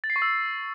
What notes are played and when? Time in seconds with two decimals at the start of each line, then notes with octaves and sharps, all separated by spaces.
0.04 A6
0.10 C7
0.16 C#6
0.22 E6